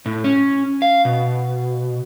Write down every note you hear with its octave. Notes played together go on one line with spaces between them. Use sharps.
A2
C#4
F5
B2